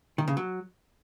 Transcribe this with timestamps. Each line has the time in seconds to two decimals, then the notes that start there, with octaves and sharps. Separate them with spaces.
0.18 D#3
0.28 C#3
0.37 F#3